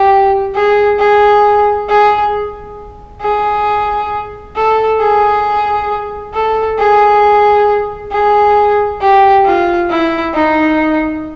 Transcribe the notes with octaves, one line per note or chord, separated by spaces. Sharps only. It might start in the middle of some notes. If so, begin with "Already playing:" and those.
Already playing: G4
G#4
G#4
G#4
G#4
A4
G#4
A4
G#4
G#4
G4
F4
E4
D#4